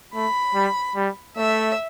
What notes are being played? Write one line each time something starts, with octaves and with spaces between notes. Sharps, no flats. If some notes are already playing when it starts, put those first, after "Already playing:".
A3 B5
G3
G3
A3 E5